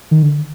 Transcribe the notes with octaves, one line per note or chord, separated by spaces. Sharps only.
D#3
D3